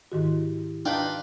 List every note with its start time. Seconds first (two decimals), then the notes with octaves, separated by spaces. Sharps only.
0.12 G#2 D#3 E4 F#4 G4
0.86 D4 D#4 F4 B4 G5